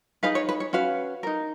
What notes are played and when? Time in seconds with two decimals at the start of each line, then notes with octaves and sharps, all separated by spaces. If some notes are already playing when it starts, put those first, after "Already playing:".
0.23 D#4 G#4 B4 F5
0.35 C#5
0.49 B4
0.60 C#5
0.73 C#4 F#4 B4 F5
1.23 D#4 A#4